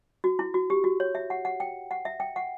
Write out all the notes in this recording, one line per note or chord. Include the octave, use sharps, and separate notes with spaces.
F#4
E4
F#4
G4
F#4
C#5
E5
F#5
F#5
G5
F#5
E5
G5
F#5